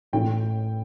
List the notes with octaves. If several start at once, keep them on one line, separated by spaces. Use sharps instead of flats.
A1 A2 E3 A3 G5